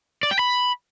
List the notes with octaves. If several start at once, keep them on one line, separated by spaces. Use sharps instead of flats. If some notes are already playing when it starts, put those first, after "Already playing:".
D5
G5
B5